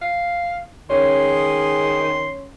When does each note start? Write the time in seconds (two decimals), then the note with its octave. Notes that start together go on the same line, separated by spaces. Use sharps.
0.02 F5
0.90 D#3 G#3 C#4 G#4 C6